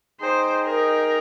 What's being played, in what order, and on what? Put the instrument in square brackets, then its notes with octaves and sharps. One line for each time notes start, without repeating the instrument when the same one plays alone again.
[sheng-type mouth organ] D#4 G#4 D#5 G5 [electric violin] C5
[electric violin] A#4